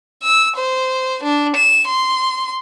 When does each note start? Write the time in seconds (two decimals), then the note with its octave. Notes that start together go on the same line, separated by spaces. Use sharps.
0.23 E6
0.56 C5
1.23 D4
1.56 E7
1.87 C6